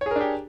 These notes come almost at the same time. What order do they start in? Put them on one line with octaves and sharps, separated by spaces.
C#5 G#4 A#4 D4 G4